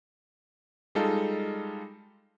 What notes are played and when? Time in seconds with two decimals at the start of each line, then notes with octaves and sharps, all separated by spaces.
0.95 G3 G#3 D#4 F4 A4